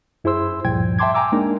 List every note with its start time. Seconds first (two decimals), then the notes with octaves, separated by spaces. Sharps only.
0.24 F#2 E4 G#4 C5 C6 E6
0.65 D2 G2 A#2 F3 G5 G#6
0.99 E5 G5 A5 C6 D6 G#6
1.14 G5 G#5 A#5 D6 E6
1.32 G#3 A#3 D4 D#4 A#4